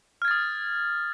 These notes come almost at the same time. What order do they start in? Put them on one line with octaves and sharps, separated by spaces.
F6 G#6 A6 D#6